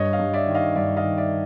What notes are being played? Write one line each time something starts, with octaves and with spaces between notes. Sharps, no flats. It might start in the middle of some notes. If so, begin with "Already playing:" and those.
Already playing: G2 C#5 D#5
D#5 F5
G2
D5 E5
D#3
D#5 F5
G2 D5 E5
D#5 F5
D#3
D5 E5